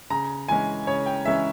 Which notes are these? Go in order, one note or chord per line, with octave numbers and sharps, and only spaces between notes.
C#3 A#5
E3 G#3 C#4 G#5
C#3 C#5
G5
E3 G#3 C#4 E5